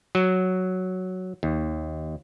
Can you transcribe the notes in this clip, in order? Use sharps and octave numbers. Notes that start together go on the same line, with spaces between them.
F#3
D#2